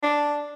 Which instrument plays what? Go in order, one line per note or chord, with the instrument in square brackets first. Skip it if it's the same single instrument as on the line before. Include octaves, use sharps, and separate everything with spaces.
[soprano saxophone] D4